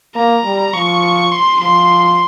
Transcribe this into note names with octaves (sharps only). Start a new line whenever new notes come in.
A#3 A#5
G3
F3 C#6
C6
F3 C6